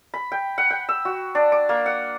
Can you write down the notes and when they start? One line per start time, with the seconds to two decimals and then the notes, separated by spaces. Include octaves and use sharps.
0.14 B5
0.32 G5
0.58 F#5
0.71 G5
0.89 E6
1.05 F#4
1.35 D4
1.52 D6
1.69 A#3
1.86 F#5